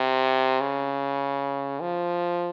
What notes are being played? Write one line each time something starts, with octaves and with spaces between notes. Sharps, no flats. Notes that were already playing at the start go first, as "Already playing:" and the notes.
Already playing: C3
C#3
F3